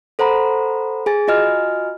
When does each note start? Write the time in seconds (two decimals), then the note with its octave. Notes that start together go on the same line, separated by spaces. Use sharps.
0.19 A4 C5 F#5 A#5 B5
1.06 G#4 G#5 A6
1.28 F4 F#4 D#5 G#5 F6